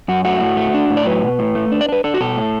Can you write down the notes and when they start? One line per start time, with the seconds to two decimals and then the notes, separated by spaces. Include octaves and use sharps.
0.08 F#2 F#4
0.24 A3 F#4
0.40 A2
0.57 A3
0.74 D4
0.90 A2
0.97 D5
1.06 F#3 B4
1.23 B2
1.39 A2
1.55 A3
1.72 D4
1.81 D5
1.89 D4 B4
2.04 D4 A4
2.14 F#4
2.21 B2 A4
2.37 A2